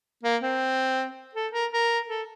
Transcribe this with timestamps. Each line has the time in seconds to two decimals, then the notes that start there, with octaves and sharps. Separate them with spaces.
0.23 A#3
0.42 C4
1.35 A4
1.53 A#4
1.73 A#4
2.09 A4